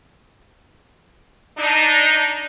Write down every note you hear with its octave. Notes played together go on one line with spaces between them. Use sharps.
D4 D#4